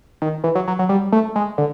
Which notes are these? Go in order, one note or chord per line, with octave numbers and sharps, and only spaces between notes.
D#3
E3
F#3
F#3
F#3
G3
A3
G#3
D3